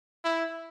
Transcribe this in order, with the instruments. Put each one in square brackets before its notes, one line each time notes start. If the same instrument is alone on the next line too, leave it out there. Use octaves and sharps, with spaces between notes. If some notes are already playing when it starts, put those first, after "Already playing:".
[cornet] E4